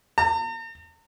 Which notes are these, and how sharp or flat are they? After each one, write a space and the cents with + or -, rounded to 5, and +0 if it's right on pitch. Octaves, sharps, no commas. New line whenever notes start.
A#5 -45